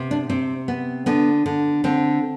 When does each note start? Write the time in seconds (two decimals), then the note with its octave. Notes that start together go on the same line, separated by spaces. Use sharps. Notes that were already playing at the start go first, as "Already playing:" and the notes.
Already playing: C3 B3
0.11 D4
0.30 C3 C4
0.68 B3
1.06 D3 B3
1.46 D3
1.84 D3 C4